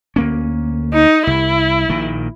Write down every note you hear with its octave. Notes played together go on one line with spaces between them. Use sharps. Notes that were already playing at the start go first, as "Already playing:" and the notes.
D2 A#3 C#4
D#4
C2 E4
A#1 A#2 D#3